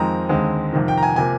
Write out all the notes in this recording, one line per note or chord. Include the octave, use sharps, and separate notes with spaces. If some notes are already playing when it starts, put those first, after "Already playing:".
Already playing: F2 D#3 G#3 C4 A#5
D#2 D3 G#3 C4
F2 C3 D#3
G5
A#5
G#5
C3 F3 A#3 G#5